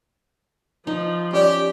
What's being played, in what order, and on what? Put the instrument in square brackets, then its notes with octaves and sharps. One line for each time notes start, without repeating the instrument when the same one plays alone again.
[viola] F3 [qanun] D#4
[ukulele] C#4 D5 [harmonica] G4